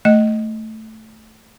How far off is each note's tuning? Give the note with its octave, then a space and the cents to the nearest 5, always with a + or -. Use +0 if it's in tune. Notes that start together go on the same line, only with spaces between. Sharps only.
A3 +0 D#5 +0